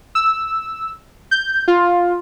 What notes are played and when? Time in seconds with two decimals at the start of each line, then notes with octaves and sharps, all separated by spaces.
0.15 E6
1.31 G6
1.68 F4